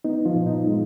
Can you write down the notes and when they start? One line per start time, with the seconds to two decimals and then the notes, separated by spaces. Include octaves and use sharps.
0.04 B3 D#4
0.25 F3 F4
0.36 A#2
0.46 D#4
0.67 G#3